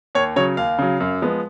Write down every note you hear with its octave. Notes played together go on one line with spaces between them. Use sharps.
D#2 C#5
C#3 F#3 C#5
D#2 F5
C#3 F#3
F#2
F3 G#3 B3